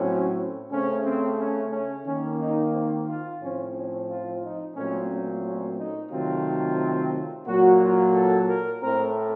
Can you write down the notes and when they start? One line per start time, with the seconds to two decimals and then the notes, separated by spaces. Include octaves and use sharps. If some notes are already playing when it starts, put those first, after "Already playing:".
Already playing: A2 F#3 C4 C#4
0.70 C#3 A3 C4 C#4
1.04 C4
1.38 C#4
1.72 C#4
2.05 D#3 A#3 C#4
2.40 D#4
2.73 C4
3.07 F4
3.40 A2 F3 C4 C#4
3.74 C#4
4.08 F4
4.42 D#4
4.75 A#2 F#3 A3 C4 C#4
5.09 C#4
5.44 C#4
5.77 D#4
6.11 C3 D#3 F#3 A3 C4 F4
7.46 A#2 F#3 A#3 F#4
7.80 F4
8.14 A4
8.47 A#4
8.81 A2 A3 C4 A#4